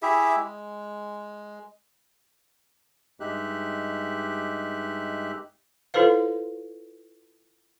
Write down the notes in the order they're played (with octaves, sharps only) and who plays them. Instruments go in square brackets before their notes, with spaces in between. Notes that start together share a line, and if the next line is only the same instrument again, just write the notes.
[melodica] E4 G4 G#4 E5
G#3
[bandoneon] G2 G#3 D#4 G4 E5 F#6
[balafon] E4 F4 A4 B4 C5 F5